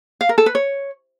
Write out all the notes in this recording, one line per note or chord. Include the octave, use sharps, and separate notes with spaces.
F5
A#4
A4
B4
C#5